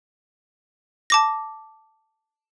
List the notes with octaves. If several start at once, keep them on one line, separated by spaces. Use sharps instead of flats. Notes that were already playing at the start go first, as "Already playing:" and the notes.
A5 D6 A#6